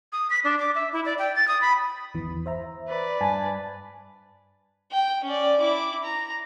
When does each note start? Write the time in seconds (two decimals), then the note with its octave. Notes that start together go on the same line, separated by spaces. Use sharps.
0.12 D#6
0.30 B6
0.44 D4
0.59 D6
0.75 E5
0.93 E4
1.05 D5
1.19 G5
1.36 A6
1.48 D#6
1.61 B5
2.14 G1 E2 E3
2.46 C5 E5 A#5
2.88 B4 D5
3.21 G2 G#5 A5
4.92 G5
5.24 C#4 D5
5.60 E4 D6
6.03 A#5